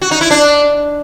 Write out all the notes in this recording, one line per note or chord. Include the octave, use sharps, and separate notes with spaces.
F#4
D#4
E4
D4